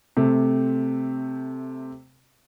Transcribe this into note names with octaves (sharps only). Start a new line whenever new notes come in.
C3 A3 C4